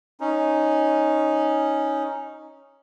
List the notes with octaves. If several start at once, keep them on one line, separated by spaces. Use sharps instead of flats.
C#4 D#4